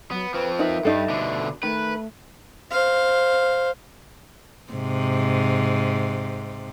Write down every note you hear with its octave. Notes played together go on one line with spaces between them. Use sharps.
F#3 B3
F3 C4 B4
D#4 A#4 B4 E5
G2 G3 D#4 A4
B2 D3
D#3 A3 B4
C5 F5
G#2 C3